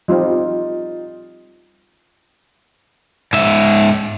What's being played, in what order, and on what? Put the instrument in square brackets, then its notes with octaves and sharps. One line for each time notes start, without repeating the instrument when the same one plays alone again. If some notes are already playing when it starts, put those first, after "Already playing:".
[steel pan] F3 G3 C4 [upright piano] D#4 F4
[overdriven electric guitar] G#2 E5